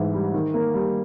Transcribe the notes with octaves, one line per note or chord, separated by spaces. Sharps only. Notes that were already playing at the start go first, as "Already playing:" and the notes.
Already playing: G#2 E3
G3
D#3
A#3
G3